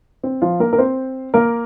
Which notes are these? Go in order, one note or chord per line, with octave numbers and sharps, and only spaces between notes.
C4
F3 F4
A#3 A#4
A#4
C4 C5
A#3 A#4